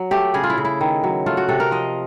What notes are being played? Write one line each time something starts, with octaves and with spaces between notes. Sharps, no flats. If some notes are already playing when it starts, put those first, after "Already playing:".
Already playing: F#3
A3 G4
C#3 G#4
F4
E4
C#3
E4
D#3
F#3
A3 F4
F#4
C3 A4
A#4
F3 D#5